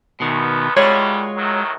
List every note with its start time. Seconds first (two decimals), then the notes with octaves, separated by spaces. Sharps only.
0.20 D2 B2 D#3 B3
0.77 A1 D#2 G3 G#3 F4 F#4 C#5
1.37 A2 D#3 F#3